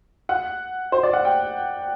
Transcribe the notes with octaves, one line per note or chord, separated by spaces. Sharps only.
F#5
C5
D5
F#5
G5